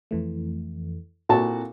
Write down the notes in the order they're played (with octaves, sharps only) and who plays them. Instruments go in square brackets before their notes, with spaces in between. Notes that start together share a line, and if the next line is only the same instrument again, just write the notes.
[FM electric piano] F2 E3 A3
[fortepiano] A#2 F#4 A5 [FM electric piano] C4 E4 A4